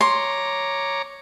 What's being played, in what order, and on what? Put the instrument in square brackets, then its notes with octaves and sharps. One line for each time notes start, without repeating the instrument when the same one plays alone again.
[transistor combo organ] C#5 A#5 D6 [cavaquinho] C6